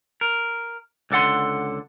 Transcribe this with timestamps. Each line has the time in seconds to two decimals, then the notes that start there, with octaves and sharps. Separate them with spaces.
0.21 A#4
1.11 C#2 D3 A4 F#5 C6